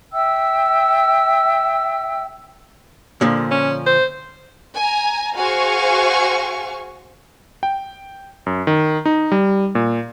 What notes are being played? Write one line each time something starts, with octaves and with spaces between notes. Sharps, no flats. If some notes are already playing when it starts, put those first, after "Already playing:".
E5 G5 E6
A#2 D3 F3
C#4
C5
G#5 A#5
F#4 G#4 C5 F5 G#5 C#6
G5
F#2
D#3
D#4
G3
A#2